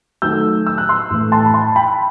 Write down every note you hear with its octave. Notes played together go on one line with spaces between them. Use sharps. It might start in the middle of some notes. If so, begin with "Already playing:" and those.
D#3 F#3 A3 E6 G6
E6
F#6
C6 E6
A2 E3 A3
A5 C6
B5
A5 C6
G5 B5